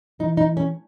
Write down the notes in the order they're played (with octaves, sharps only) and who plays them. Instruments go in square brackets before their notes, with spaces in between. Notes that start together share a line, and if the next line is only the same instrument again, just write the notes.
[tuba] E3 [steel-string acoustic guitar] D#4
[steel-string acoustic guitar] D#4
C#4